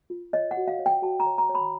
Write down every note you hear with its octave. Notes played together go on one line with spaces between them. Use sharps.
F4
C#5 D#5
F#5
F#4
F5
C#5
G5
F#4 A5
A#5
C#5
A#5
C#5
B5